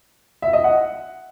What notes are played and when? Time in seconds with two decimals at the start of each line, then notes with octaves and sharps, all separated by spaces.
0.42 E5
0.53 D#5
0.64 F#5